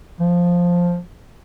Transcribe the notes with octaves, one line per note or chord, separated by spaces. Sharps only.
F3